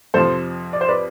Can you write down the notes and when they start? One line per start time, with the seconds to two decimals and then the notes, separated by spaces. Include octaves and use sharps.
0.14 F2 C3 F3 A4 C5
0.73 D5
0.81 C5
0.88 B4 D5